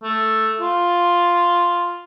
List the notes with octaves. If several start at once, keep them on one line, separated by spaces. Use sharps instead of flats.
A3
F4